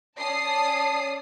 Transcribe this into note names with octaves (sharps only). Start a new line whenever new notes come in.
C#4 D5 A5 D#6 C7